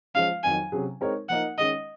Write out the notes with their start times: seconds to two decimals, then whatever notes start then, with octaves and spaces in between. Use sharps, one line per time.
0.15 F3 G#3 C#4 F5
0.44 F2 D#3 F#3 G#5
0.72 C3 F#3 C#4 G#4
1.01 G#3 C4 D#4 A#4 C#5
1.29 F3 A#3 D#4 A#4 D#5 F#5
1.58 D#3 G#3 C#4 D#5